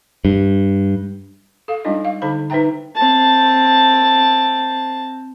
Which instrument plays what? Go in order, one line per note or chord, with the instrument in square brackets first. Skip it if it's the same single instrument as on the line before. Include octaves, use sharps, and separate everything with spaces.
[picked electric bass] G2
[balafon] A4 F5
G3 G#3 D4 D#4 F4 D#5
F5
D3 D#4 C5 B5
D#4 B4 C5 E5 G5 A#5
[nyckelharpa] C4 A5